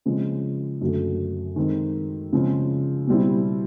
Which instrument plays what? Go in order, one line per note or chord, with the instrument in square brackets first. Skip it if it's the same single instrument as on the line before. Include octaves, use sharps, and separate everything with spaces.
[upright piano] C#3 F3 G#3 C4
F#2 D3 F#3 A3
D#3 G#3 C4 D#4
C#3 F3 G#3 C4
B2 G3 C4 E4